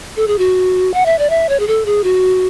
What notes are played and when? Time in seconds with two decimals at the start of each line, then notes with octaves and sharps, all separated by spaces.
0.17 A4
0.27 G#4
0.38 F#4
0.94 F#5
1.06 E5
1.19 D5
1.30 E5
1.49 C#5
1.59 G#4
1.68 A4
1.86 G#4
2.04 F#4